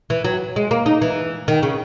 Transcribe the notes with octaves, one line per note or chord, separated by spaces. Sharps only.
E3
F#3
G#3
A#3
D#4
E3
D#3
C#3